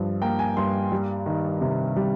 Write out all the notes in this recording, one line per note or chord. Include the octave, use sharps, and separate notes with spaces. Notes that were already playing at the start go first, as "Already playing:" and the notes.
Already playing: G2 F3
A#3 G5
G#5
G2 C6
G3
D#3
C3
G3